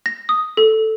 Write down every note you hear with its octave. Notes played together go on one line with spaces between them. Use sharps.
A#6
D#6
A4